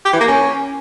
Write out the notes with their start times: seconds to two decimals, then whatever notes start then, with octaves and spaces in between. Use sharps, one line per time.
0.05 G4
0.13 E3
0.20 A#3
0.28 C#4